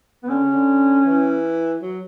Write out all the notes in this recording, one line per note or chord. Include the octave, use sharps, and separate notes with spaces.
B3
D3 C#4
C#3
D3
E3
F#3